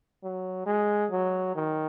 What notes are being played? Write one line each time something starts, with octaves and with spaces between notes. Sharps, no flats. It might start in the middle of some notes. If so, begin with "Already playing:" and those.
F#3
G#3
F#3
D#3